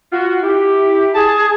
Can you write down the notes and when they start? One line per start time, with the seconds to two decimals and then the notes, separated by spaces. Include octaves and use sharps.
0.12 F4 F#4
0.42 E4 G4
1.15 G#4 A5